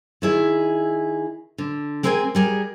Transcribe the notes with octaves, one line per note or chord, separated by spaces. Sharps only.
D#3 E4 G#4
D3
G#3 C4 G#4 A#4 G5 G#5
G3 G#4 A#4